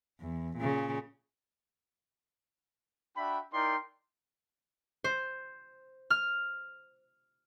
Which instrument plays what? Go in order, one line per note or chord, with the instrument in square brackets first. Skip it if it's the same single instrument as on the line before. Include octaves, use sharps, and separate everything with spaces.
[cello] E2
A#2 C#3
[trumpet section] D4 F#4 E5 G5 B5
D#4 E4 A#4 D5 G5 C6
[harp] C5
F6